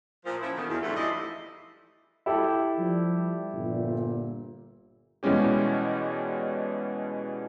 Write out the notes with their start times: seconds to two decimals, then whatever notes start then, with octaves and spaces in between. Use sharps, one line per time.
0.25 A#2 F3
0.40 F3 C#4 E4
0.55 B2 D3 D#3
0.68 E2
0.81 D2 G#2 G3 A3
0.96 E3 F3 E4 D5 D#5
2.26 E4 G4 A4
2.79 F3 G3
3.53 G1 A#2
5.23 B2 E3 G3 G#3 C#4 G4